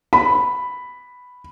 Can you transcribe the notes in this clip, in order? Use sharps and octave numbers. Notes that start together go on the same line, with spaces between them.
B5